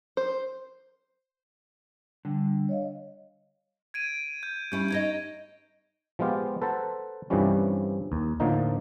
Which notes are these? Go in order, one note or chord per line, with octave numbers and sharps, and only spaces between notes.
C5
D3 G3
C#5 D#5 F5
G#6 D7 D#7
G6
G3 C#4 E4 G6
D#4 C#5 D#5 G#6 A#6
F3 G#3 B3 F4 G4
A4 B4 C5 F#5 A5 A#5
G2 C3 E3 F3 G3 C#4
D#2
A2 D3 F3 A#3 D#4